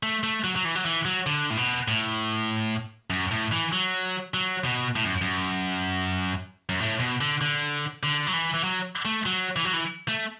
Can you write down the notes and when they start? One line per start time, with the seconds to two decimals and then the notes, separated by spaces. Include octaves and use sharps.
0.03 A3
0.23 A3
0.44 F#3
0.56 F#3
0.65 E3
0.75 F#3
0.85 E3
1.05 F#3
1.26 D3
1.50 A2
1.57 B2
1.88 A2
3.10 F#2
3.31 A2
3.52 E3
3.72 F#3
4.34 F#3
4.64 B2
4.96 A2
5.04 F#2
5.22 F#2
6.69 F#2
6.80 A2
7.00 B2
7.21 D3
7.41 D3
8.03 D3
8.27 F#3
8.33 E3
8.54 E3
8.64 F#3
9.05 A3
9.26 F#3
9.56 E3
9.65 F#3
9.73 E3
10.08 A3